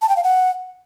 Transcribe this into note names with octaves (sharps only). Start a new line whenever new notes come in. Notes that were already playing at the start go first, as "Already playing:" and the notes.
A5
G5
F5
F#5